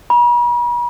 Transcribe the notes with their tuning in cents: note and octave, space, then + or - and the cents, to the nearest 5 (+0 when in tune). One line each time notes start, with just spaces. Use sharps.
B5 -45